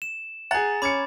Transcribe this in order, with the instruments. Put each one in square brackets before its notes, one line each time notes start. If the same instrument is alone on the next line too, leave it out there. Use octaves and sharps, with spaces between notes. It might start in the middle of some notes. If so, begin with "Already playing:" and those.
[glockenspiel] E7
[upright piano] G#4 F#5 [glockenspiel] A#5 A6
[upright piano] C#4 C#7 [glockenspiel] B5 D6 G#6